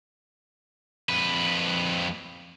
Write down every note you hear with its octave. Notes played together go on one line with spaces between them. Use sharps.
F2 B4